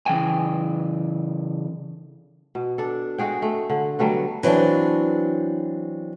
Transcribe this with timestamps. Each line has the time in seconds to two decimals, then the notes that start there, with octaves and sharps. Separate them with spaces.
0.06 C#3 E3 G5 G#5
2.55 B2
2.78 D4 A4
3.18 G#3 F#4 G#4 G5
3.42 A3
3.70 D3
3.99 F#3 G3 A3 B3
4.43 E3 F#3 G3 C4 D4